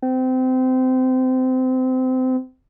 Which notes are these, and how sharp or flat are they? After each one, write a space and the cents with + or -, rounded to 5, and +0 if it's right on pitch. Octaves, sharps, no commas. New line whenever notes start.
C4 -25